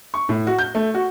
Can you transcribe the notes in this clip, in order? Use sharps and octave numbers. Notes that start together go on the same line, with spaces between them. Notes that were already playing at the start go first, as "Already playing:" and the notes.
C#6
A2
F#4
G6
A3
F#4